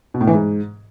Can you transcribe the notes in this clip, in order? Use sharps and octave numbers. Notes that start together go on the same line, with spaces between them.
B2
A2
E3
G#2